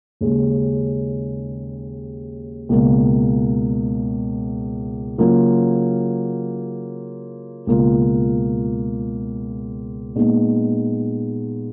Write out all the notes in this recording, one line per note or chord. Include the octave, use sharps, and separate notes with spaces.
D#2 C#3 G#3 C#4
C#2 B2 A#3
C#3 F#3 A#3 F4
C#2 B2 A#3 F4
A#2 G#3 B3 D#4